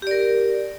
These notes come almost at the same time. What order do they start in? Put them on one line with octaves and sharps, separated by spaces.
G4 D5 A#4